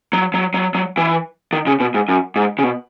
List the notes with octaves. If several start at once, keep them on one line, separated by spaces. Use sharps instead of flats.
F#3
F#3
F#3
F#3
E3
D#3
C#3
B2
G#2
F#2
G#2
C#3
B2